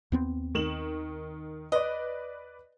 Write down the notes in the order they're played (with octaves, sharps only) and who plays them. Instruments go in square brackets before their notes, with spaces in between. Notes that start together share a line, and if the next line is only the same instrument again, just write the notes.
[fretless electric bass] D#2 B3 C4
[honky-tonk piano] D#3 E7 F#7
[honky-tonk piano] B4 D5 [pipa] D#5